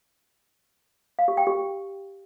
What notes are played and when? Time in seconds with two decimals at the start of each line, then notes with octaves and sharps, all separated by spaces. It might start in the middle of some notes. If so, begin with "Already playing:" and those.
1.19 F5
1.28 G4
1.37 G5
1.47 G4